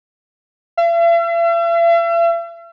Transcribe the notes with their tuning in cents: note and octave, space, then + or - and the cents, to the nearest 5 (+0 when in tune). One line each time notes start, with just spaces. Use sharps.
E5 +45